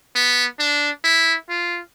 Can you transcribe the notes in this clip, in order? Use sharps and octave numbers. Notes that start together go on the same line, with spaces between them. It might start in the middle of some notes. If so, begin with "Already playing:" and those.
B3
D4
E4
F4